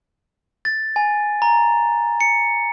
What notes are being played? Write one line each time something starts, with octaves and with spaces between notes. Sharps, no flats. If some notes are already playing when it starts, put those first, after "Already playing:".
A6
G#5
A#5
C#7